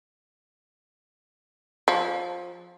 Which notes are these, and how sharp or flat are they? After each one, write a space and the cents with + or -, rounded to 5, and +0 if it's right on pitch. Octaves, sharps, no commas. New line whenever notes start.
F3 +20